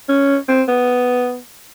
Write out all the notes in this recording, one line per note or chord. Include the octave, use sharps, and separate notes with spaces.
C#4
C4
B3